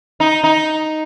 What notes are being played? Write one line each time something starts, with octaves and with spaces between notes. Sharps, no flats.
D#4
D#4